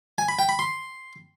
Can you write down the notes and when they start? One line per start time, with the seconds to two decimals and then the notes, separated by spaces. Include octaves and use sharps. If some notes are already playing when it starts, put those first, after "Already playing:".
0.18 G#5
0.29 B5
0.39 G5
0.49 B5
0.59 C6